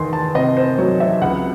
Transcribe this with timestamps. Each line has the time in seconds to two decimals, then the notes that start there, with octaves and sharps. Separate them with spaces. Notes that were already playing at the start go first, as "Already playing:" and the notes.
Already playing: E2 D#3 C6
0.13 A5
0.35 C3 D#5
0.57 C5
0.78 F#3 C#5
1.00 E5
1.21 C#2 F#5